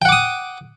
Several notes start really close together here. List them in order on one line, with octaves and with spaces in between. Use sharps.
G5 F#5 D6 D#6